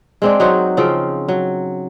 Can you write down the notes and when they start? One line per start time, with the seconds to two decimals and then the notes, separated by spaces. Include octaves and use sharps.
0.22 G#3 C4 D4
0.40 F#3 D#4 F#4 C5
0.77 C#3 F3 C4
1.29 F#3